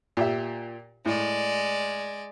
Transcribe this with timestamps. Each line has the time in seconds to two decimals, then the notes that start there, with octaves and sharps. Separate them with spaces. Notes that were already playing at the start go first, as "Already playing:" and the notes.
0.17 A#2 G4 E5
1.06 A2 G#3 D5